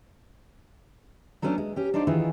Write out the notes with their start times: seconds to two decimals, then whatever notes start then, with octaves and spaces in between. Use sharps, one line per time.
1.42 F#3 A3 B3 C#4 D4
1.58 G#3
1.76 C#4 G4
1.94 D4 D#4 F4 C5 D5
2.07 D#3 E3 E4 F4 G#4